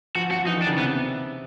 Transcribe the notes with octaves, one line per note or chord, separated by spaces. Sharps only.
F3 F#4
F3 F#4
E3 D#4
D#3
D4
C#3
C3 B3